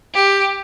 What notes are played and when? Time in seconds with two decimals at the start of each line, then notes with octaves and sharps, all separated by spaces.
0.12 G4